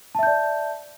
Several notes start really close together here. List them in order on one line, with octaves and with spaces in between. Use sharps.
A5 E5 G6 D5